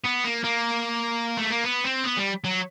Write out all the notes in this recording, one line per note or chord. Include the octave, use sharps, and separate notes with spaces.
B3
A#3
A#3
A3
A#3
B3
C4
B3
G3
F#3